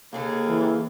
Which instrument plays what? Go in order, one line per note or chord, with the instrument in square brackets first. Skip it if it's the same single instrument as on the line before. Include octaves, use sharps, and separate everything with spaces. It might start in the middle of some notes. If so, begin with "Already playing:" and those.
[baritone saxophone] D#2 [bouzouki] C#3 G#4 A4 [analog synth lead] A#3
[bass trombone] E3